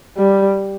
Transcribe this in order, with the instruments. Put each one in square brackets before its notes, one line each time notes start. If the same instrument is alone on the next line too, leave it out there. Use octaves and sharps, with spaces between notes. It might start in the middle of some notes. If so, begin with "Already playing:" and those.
[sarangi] G3